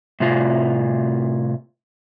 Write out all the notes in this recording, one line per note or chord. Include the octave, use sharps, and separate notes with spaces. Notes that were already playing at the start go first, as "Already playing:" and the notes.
A2 C3 F4